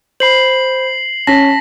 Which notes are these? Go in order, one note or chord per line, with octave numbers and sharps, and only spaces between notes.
C5 B5 C7 F#7
C#4 A5 A#6 B6